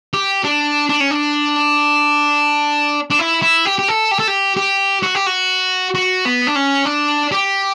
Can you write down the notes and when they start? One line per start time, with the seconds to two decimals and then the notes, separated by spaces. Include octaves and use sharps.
0.14 G4
0.44 D4
0.89 D4
1.00 C#4
1.11 D4
3.10 D4
3.19 E4
3.42 E4
3.65 G4
3.79 G4
3.88 A4
4.11 G4
4.19 A4
4.28 G4
4.57 G4
5.03 F#4
5.15 G4
5.26 F#4
5.95 F#4
6.25 B3
6.47 D4
6.55 C#4
6.85 D4
7.32 G4